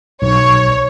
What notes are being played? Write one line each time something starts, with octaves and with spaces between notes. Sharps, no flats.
B1 C#5